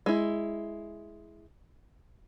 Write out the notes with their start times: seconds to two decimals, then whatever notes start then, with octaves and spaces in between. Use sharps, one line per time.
0.06 G#3 E4